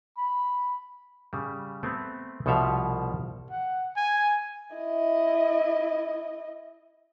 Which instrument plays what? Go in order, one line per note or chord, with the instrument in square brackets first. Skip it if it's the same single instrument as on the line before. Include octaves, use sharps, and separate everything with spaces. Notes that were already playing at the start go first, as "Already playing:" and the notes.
[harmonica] B5
[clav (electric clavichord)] C#3 G3
A3 B3 C4
C2 B2 F3 A4 E5 F5
[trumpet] F#5
G#5
[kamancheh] E4 D#5